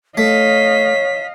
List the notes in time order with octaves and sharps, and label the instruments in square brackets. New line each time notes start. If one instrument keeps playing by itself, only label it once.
[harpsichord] A3 [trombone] C#5 [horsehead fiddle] D#5 F5 [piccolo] B6